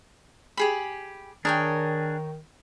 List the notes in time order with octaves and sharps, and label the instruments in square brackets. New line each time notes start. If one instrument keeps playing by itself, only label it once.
[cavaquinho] G4 G#4 B5
[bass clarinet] D#3 [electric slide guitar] D4 G#4 [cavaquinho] A#4 C#5 G5